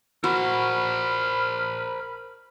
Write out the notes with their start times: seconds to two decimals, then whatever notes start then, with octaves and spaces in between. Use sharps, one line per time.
0.24 F#4 A#4 C5 B5 F6